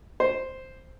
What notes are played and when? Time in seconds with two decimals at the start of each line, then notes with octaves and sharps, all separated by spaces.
0.20 C5